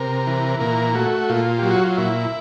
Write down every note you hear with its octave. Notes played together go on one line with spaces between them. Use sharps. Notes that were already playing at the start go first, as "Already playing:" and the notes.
Already playing: C3 A#4
E3
A#2 A#4
A3 F#4
A#2 F4
F#3 G4
F#4
F4
A#2 E4